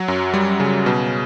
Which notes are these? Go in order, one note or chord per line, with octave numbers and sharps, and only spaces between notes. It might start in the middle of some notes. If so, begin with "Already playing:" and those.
Already playing: F#3
F#2
G3
C#3
B2